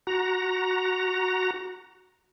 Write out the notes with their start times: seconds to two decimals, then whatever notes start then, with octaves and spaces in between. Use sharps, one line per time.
0.07 F#4 A#5